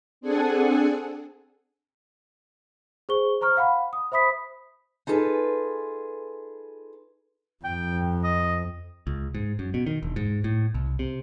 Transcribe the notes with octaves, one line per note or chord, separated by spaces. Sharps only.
C4 D4 G#4 A4 F#5 G#5
G#4 C5 C#6 G7
C5 A#5 C#6 F6
F5 F#5 B5
D#6
C5 E5 B5 D#6 B6
D#4 F4 G#4 A4 B4
F2 G5
D#5
C#2
G#2
F#2
B2
D#3
E1
G#2
A2
C2
C3